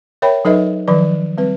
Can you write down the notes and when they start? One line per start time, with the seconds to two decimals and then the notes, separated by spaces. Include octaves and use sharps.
0.22 A#4 C#5 E5 G5 B5
0.45 F#3 D#4 A4 B4 D#5 E5
0.88 D#3 F3 F#3 B4 D5
1.38 G3 C4 B4